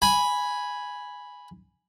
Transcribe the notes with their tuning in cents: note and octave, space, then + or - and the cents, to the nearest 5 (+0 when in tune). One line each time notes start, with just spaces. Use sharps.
G#5 +0 B5 -5